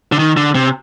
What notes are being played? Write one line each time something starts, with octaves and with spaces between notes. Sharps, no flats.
D3
D#3
D3
C3